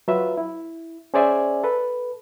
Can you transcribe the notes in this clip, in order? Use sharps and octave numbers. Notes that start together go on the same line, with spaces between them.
F#3 F4 B4 E5
E4
C#4 G#4 C5 D5 E5 G#5
A4 B4